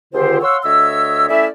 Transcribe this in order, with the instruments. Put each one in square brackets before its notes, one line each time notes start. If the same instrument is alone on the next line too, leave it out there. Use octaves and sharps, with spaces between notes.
[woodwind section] C#2 D3 D#3 F4 G4 C5
C#5 F5 F#5 C6 C#6 E6
D2 C#5 D#5 E5 E6
A3 C#4 E4 D5 E5